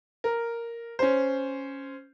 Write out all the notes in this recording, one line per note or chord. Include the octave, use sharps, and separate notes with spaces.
A#4
C#4 C5